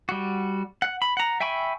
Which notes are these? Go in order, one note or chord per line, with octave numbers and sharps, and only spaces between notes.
G3 F#4
F#5
B5
F#5 A#5
E5 G5 G#5 B5 C#6